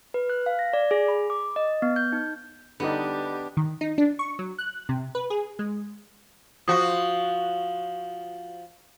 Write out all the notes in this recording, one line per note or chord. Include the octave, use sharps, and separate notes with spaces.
B4
F#6
F5
A#6
D5
G#4
B5
D6
D#5
B3
G6
D#4
D3 G3 B3 D4 D#4 G4
D#3
D#4
D4
C#6
F#3
F#6
C3
B4
G#4
G#3
F3 F#4 D#6